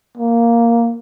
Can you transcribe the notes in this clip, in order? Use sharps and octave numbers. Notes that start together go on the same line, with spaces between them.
A#3